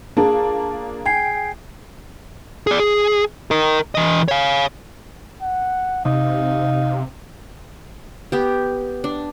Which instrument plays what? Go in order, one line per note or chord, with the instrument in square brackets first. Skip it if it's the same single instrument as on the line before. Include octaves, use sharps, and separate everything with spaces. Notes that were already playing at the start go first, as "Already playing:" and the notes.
[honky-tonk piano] A#3 D4 F4 [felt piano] G#4 [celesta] A5
[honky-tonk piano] G5 [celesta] G#5 G#6 C7
[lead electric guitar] G#4 D5
G#4
A#4 D#5
E3 D#5
C#5 F5
[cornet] F#5
[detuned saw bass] C3 [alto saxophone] D#4 [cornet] F5
[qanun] B3 G4
D4